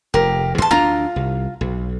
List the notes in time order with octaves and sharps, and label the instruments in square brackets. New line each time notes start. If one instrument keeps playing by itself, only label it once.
[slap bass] F1 [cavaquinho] G4 A#4
[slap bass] E2 [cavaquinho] A5 C6
[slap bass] D2 D4 [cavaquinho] F4 A#5
[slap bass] C2
B1